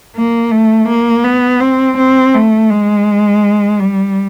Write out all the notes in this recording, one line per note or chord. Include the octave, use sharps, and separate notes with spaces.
A#3
A3
A#3
B3
C4
C4
A3
G#3
G3